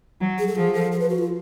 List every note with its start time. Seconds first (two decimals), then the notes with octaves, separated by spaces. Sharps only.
0.21 F#3
0.39 G#4
0.47 A4
0.55 F3 G#4
0.73 A4
0.92 A4
1.00 B4
1.10 F#4
1.18 F4